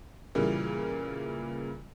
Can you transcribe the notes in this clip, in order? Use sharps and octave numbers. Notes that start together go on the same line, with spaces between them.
A#2 C#3 E3 G3 A#3